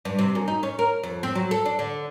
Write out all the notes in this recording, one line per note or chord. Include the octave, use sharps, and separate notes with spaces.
G2
C3
F#2
D#4
C#4
A#4
F2
C4
F#3
A4
D4
D3